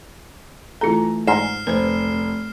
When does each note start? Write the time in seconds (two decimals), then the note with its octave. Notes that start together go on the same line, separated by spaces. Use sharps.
0.81 E3 A3 F4 A4 A#5
1.27 G#2 D5 F6 C7 E7
1.67 F1 B4 C5